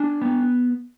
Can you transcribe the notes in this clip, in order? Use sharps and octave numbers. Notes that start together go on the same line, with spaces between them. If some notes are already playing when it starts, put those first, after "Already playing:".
Already playing: D4 G#5
B3